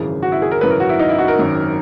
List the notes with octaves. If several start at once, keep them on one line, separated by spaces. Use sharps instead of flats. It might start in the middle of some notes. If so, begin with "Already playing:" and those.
Already playing: G#1 F#2 C#3 E3 G#4
F#4
E4
G#4
A#4
G#1 F#2 C#3 E3 B4
A#4
F#4
E4
D#4
E4
F#4
A#4
G#1 F#2 D#3